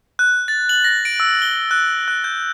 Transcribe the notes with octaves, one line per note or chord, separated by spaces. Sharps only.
F#6
A6
F#7
A#6
D7
E6
G7
F#6
F#6
G6